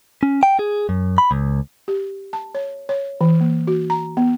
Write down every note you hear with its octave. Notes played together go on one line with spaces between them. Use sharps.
C#4
G5
G#4
F#2
B5
C#2
G4
A5
C#5
C#5
E3
A#3
F#4
A#5
B3